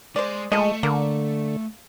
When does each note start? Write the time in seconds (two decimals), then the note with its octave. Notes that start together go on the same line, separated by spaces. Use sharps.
0.16 G#3 C5 D5
0.52 F3 G#3 A3 D#5
0.83 D3 A#3